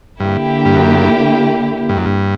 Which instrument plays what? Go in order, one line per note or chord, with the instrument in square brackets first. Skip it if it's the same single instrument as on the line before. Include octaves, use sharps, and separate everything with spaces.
[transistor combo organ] G2 [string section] D3 A#3 E4 G4
[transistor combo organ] G2
F#2
G2
F#2
G2